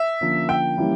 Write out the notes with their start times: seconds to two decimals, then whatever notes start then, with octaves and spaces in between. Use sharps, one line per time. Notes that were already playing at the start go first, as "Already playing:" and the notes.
Already playing: E5
0.21 D3 F3 A#3 C#4
0.49 G5
0.77 E3 G3 A#3 C#4 E4